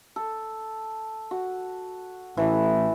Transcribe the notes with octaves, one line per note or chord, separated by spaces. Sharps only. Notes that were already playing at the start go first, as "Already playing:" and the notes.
A4
F#4
A1 E3 A3 E4